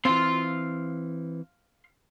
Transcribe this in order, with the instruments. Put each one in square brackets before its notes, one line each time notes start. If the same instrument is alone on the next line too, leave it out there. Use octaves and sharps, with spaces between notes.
[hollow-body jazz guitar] E3 C4 [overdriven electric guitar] F5 C6